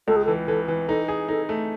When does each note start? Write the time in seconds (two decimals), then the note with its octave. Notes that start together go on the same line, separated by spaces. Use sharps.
0.08 C#2 A4
0.16 G#4
0.25 A4
0.28 E3
0.48 E3 A4
0.68 E3
0.88 D#4 A4
1.08 G#4
1.28 D#4 A4
1.49 A3